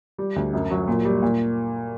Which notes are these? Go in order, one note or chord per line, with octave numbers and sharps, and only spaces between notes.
G3
D2
F#2
F#3
A#2
G3
A#2